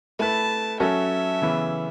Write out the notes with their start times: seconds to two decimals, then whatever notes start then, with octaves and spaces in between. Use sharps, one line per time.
0.19 A3 E4 B4 A5
0.80 F#3 C#4 F#4 A4 E5
1.42 C#3 E3 B3 E4